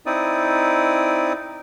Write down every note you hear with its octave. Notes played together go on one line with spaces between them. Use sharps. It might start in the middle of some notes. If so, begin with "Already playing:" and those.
C4 D#4 E4 D5 D#6